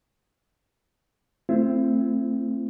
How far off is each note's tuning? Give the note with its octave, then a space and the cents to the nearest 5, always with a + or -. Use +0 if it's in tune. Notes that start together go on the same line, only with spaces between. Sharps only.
A3 +15 C4 +0 E4 +40